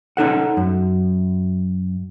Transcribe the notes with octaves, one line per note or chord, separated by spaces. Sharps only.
C#4 D#4 A4 F#5
F#2